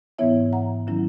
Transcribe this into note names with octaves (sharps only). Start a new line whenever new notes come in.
G#2 E3 B3 E4 C#5 E5
F#5 A#5
D#3 F#3 C#4 E4